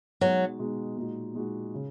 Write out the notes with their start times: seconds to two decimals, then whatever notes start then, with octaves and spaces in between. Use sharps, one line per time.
0.21 B2 F#3 G#3 D#4 F#4
0.59 B2 G#3 D#4 F#4
0.97 A#2 G#3 D#4 F#4
1.34 A#2 G#3 D#4 F#4
1.74 C#3